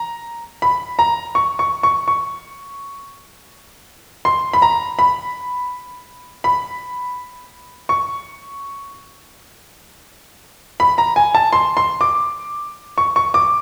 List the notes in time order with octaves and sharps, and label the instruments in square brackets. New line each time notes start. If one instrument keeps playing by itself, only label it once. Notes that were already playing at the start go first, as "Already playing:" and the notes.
Already playing: [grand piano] A#5
B5
A#5
C#6
C#6
C#6
C#6
C6
B5
A#5
B5
B5
C#6
B5
A#5
G#5
A5
C6
C6
D6
C#6
C#6
D6